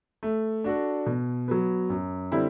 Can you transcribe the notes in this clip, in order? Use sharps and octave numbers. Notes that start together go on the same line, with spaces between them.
A3
D4 F#4 A4
B2
F#3 B3
F#2
D3 G3 C4 E4